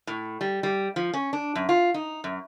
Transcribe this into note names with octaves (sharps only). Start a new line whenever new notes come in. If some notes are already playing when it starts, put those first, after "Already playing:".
A2
G3
G3
F3
C#4
D4
F#2
F4
D#4
F#2